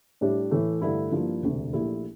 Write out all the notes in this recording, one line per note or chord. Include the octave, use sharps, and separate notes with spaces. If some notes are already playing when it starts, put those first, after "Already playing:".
A2 G3 D4 G4
A2 E3 A3
G2 D3 A3 E4 A4
G2 F3 A#3 E4
E1 D2 C3
A#1 A#2 A3 E4 G4